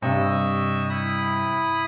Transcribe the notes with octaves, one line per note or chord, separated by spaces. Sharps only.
G2 C3 D#5 C#6 E6
E4 B5 D#6